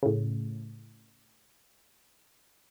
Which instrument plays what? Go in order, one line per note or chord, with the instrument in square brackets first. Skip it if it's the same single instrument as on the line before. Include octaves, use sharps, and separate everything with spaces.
[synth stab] A2 C#3